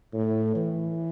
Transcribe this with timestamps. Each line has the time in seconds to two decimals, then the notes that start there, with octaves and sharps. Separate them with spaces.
0.13 A2
0.55 E3